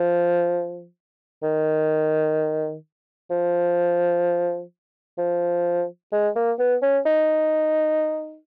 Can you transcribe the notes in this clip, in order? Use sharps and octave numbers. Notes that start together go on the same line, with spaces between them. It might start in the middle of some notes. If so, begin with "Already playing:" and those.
Already playing: F3
D#3
F3
F3
G#3
A#3
B3
C#4
D#4